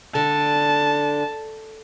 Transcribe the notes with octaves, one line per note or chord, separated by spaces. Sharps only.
D3 A5